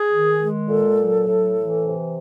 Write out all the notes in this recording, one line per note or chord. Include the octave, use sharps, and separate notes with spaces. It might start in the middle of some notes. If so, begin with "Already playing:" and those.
Already playing: G#4
D#3
G#3
A#2 A4
F#3
A2
E3
C3